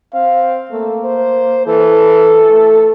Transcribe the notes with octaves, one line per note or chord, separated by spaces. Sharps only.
C4 F5
A3 A#3
C5
E3 A4
A3